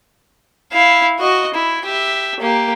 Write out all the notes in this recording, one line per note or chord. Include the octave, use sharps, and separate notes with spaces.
E4 F5
F#4 D#5
E4
G4 E5
A#3 G4